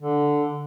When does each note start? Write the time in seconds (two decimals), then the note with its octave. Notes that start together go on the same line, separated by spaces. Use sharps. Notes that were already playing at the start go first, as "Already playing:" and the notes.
0.01 D3